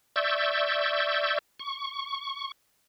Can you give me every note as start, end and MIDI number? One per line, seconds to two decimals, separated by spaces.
0.16 1.39 74
0.16 1.39 76
0.16 1.39 85
0.16 1.39 88
0.16 1.39 91
1.60 2.52 85